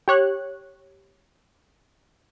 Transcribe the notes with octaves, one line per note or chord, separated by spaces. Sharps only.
G4 C#5 F#6